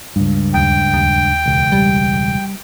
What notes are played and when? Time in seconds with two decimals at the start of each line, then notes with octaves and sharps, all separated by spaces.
0.16 C#2 G2
0.54 D#2 G5
0.94 D#2
1.46 E1 C#2
1.72 G3